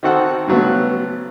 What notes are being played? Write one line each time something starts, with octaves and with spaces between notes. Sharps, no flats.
D#3 C4 F#4 A4 F#5
G2 C#3 F#3 A3 B3